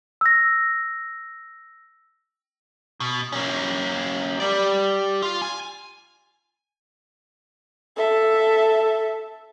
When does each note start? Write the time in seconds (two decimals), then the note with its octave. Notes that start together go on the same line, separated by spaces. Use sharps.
0.21 E6 A#6
3.00 B2
3.32 A#3 C#4
4.40 G4 D5
5.22 F4
5.42 G#5
7.97 A4 E5